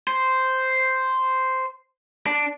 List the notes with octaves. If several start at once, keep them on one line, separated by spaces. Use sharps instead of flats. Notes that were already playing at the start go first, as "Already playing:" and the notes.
C5
D4